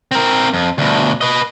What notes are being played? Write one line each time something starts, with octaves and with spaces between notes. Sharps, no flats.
C4 A#4
F2
D2 B2
B4 D#5